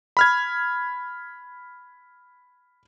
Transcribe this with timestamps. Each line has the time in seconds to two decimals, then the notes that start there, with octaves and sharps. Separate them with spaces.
0.17 B5 F6 G#6